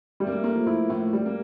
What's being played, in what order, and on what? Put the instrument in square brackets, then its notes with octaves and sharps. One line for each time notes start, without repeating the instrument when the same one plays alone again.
[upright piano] G3 [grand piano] A3
[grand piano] A#3
A3
[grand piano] A3 [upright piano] A#3
[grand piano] F3
[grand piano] A3 [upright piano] E4
[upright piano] A2 [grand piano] A3
[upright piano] G3
[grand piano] A#3